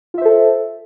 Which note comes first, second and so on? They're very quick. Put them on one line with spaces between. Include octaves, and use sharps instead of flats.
F4 E5 C5 A4